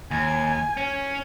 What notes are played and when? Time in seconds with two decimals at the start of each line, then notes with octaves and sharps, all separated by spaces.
0.11 D#2 G#5
0.77 C#4